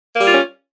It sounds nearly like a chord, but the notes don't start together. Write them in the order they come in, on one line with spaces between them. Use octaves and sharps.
A#3 G3 F4 C#4